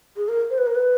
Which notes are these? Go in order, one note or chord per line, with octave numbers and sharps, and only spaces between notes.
G#4
A#4
C5
B4
A#4
B4